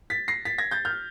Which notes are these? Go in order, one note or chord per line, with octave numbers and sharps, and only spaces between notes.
A6 B6
A#6 C7
A6 B6
G#6 A#6
G6 A6
F6 G6